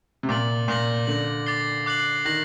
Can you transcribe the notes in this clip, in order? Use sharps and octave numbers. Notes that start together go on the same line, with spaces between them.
C3
A#2 D6 A6 D7 F#7
A#2 D6 G6 A#6 F#7
D3 G6 A#6 F#7
D6 A6 C7 G7
D6 F#6 C7 F#7
D#3 F#6 A#6 F#7